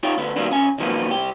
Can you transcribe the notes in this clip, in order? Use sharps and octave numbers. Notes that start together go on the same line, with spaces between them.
D#4 F4 G4 C#5
D2 D3 B3
D#3 F#3 G3 A#3 B3 D4
B1 C#4 G#5
B2 D#3 F3 F#3 A#3 B3
C2 G4